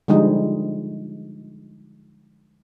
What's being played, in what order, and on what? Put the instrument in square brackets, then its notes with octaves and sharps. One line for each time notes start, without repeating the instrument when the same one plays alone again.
[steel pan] D3 F3 G3 G#3 D#4